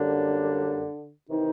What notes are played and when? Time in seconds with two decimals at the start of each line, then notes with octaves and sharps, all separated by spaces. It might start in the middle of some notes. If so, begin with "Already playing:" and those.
Already playing: F#2 D3 G3 A#3 D4
1.29 C3 D#3 E3 D#4